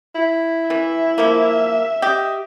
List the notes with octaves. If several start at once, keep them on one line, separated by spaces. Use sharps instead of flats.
E4
E3 E5
F3 A#3
G4 D#5